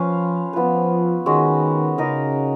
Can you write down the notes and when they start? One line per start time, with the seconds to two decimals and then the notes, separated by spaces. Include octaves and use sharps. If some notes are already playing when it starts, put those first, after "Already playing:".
Already playing: F3 C#4 F4 B4 F5
0.53 F3 B3 F4 B4
1.26 D#3 G#3 C#4 F#4 B4
1.98 C#3 D#4 A#4 D#5